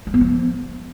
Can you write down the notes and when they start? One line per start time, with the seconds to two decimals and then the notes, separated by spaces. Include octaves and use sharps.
0.07 G3
0.14 B3
0.21 F3